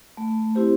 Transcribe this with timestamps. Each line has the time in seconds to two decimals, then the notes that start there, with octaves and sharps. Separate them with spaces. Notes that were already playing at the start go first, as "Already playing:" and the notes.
0.17 A3
0.55 C4 E4 G4 C5